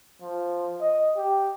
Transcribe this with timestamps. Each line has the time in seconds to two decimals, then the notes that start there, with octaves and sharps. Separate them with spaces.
0.21 F3
0.81 D#5
1.17 G4